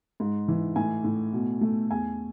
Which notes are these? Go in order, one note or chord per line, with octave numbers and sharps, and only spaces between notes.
G#2
E3
A2 G#5
A2
B2
A3
E2 G#5